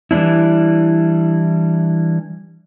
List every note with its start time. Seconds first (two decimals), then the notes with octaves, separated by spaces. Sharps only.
0.11 E3 G3 C4 D4 E4